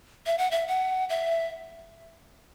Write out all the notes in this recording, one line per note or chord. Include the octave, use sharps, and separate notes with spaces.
E5
F#5
E5
F#5
E5